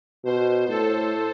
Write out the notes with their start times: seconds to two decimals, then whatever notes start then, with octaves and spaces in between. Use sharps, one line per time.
0.24 B2 C5
0.69 A2 A4